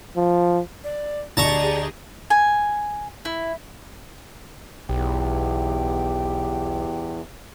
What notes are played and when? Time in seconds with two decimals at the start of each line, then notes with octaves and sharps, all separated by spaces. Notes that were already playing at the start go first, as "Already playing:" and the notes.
0.17 F3
0.84 D5
1.37 D2 G4 G#4 D5 D#5 A5 A#5 C#6
2.30 G#5
3.25 E4
4.89 B1 E2 G4